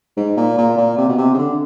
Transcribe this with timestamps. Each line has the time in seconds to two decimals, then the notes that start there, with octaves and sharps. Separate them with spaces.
0.17 G#2
0.37 A#2
0.58 A#2
0.78 A#2
0.98 C3
1.08 B2
1.18 C3
1.34 C#3
1.38 D3